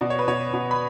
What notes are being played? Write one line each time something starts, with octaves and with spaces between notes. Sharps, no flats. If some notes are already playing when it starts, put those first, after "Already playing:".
B2 D5
C#5
B4
B2 C#5
B2
B5